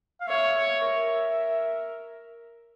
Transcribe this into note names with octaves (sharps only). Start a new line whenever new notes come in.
F5
C#5 E5
C#5
A#4